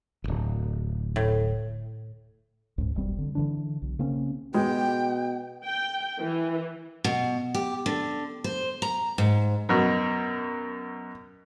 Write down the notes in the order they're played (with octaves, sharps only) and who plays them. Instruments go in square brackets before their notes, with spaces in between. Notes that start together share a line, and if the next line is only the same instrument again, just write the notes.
[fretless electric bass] D1 G1
[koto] A2
[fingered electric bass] C#2 G#2
E1 B1 G3 C4
D3
D3 E3 D4
B1
C#3 A#3 C4 C#4
[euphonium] B2 [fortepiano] G#3 [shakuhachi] G5
[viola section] G5
E3
[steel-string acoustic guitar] B2
G4
D3
C5
A#5
G#2
[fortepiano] F#2 B2